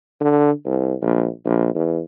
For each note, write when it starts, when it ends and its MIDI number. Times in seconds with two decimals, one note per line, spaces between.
0.20 0.51 50
0.66 0.93 36
1.02 1.28 34
1.45 1.72 34
1.75 2.00 40